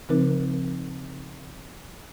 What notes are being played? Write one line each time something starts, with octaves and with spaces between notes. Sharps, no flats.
C#3 F3 C4 D#4 A#4